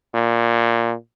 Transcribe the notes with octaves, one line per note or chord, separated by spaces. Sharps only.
A#2